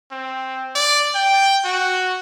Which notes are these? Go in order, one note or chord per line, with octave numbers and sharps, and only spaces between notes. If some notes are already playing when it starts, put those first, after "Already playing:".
C4
D5
G5
F#4